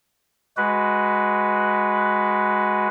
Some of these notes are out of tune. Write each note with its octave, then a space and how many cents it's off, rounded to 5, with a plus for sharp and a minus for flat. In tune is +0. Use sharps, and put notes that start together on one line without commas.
G#3 +0 F#4 +0 B4 +0